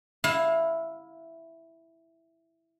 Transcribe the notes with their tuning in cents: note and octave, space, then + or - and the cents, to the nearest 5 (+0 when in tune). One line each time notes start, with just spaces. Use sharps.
E4 +0 F5 +25